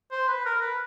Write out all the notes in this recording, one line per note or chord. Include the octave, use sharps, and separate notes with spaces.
C5
B4
A#4
B4